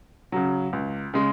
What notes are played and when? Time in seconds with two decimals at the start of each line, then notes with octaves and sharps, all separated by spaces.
0.32 C#3 F#3
0.73 C#2
1.14 C#3 G#3